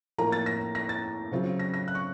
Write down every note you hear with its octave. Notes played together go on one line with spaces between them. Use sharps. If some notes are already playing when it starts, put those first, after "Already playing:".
A2 F3 A#3 A#5
A6
A#6
A#6
A6
C#3 F#3 C4 F4
A#6
A#6
F#6
C#6